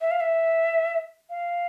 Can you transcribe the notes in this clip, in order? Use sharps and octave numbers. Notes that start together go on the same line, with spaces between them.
E5
F5
E5
F5